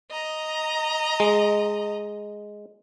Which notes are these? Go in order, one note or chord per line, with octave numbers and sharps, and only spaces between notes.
D#5 A#5
G#3